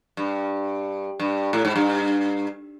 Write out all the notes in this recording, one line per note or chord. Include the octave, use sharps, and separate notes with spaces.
G2
G2
A2
G#2
G2